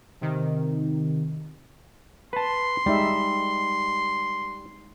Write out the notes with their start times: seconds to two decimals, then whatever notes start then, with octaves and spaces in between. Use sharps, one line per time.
0.21 C3 D#3
2.33 B4 A5 C6
2.86 G3 G#3 D#4 E5